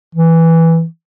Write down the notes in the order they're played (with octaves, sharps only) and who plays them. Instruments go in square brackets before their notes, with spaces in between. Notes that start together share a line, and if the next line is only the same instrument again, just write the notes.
[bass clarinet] E3